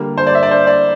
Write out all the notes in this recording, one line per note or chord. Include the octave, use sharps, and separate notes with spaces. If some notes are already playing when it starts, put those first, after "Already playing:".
Already playing: D3 G3 A#3
C5
D5
E5
D5
C5
D5